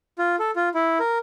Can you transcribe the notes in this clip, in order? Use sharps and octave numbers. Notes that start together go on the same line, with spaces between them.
F4
A4
F4
E4
A#4